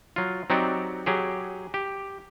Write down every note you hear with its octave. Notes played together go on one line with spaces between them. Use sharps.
F#3 F4
F#3 C4 D#4 F#4 G4 D5
F#3 G4 G#4
G4